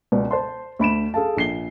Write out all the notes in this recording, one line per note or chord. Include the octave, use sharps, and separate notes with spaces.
C#2 B2 D5
C5 A5 C6
D2 B5 D7 E7
G#4 A4 F5 A5
A#1 C7 G7